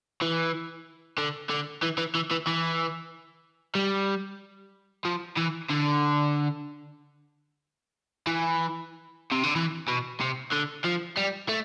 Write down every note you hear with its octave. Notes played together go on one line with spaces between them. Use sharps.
E3
D3
D3
E3
E3
E3
E3
E3
G3
F3
E3
D3
E3
C3
D3
E3
B2
C3
D3
F3
G3
A3